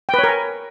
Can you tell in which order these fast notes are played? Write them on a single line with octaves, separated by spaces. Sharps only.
G5 B4 C#5 A#4 G#5